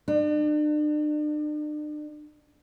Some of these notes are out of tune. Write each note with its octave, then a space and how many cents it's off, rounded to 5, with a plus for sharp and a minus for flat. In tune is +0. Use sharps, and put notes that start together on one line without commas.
D4 +40